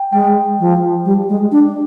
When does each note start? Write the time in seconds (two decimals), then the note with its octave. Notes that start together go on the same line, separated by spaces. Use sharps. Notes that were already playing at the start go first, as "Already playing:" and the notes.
Already playing: G5
0.13 G#3 G5
0.60 F3
1.05 G3
1.29 G#3
1.52 D4